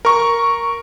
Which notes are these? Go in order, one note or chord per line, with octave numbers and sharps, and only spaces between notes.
A#4 C#6